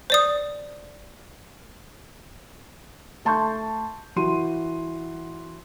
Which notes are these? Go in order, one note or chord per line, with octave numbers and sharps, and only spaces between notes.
C5 D5 D#6
A3 A5 C6 C#6 G6
E3 F#4 C6 D#7